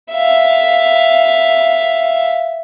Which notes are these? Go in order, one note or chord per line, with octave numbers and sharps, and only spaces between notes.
E5 F5